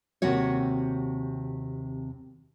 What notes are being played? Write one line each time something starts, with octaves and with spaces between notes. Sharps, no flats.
D#2 C3 C4 F#4 C#5